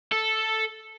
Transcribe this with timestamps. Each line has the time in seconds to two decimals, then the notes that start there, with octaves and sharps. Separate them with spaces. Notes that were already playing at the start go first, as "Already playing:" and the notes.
0.12 A4